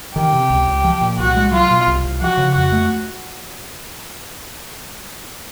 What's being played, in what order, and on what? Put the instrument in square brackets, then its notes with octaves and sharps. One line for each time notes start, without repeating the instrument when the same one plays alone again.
[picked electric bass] D#3 [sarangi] G4
[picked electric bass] C3
C#2
C#2
F3
A#2
[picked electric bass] C2 [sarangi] F#4
[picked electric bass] G#3
[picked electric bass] F#3 [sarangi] F4
[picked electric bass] B2
C2
C2
[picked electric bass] F3 [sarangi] F#4
[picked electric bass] C#3
[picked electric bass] F2 [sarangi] F#4
[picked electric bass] A3